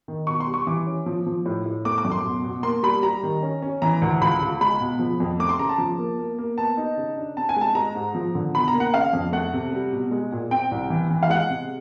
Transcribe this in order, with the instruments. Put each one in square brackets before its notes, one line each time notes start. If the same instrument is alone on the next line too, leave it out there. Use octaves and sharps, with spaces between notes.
[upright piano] D#3
B2 C#6
C6
G3
C#6
E3 D6
C#4
F3
F3
A2
A2
A3 D6
D6
F#2
C6
B2
B2
A#3 C6
G3 B5
G3 A#5
D#3
C#4
C#4
E3 A#5
D2
C#2 B5
C#2
G#3 B5
B2
F3
F2
A3 D6
C6
C#3 A#5
A5
F3
A#3
A#3
A#3
B3 A5
D#4
C#3
D4
C4 A5
G#5
G#3 A5
G#3 A#5
G#2
F3
D3
B2 B5
A#5
A#3
F#5
C#3 F5
F2
A3 F#5
C3
G3
B2
G#3
A#2
C4 G5
C2
E3
E3
F5
G#3 F#5
C3